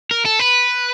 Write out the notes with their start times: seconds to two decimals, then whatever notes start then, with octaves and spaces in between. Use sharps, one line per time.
0.11 A#4
0.25 A4
0.39 B4